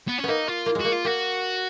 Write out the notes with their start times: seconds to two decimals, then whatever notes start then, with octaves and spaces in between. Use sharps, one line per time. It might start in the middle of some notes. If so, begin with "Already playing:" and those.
0.08 B3
0.18 C#4
0.24 A#3 B3 D#4
0.48 F4
0.66 A#3
0.75 G#3 F#4
0.85 A#3
0.92 F4
1.05 A#3 F#4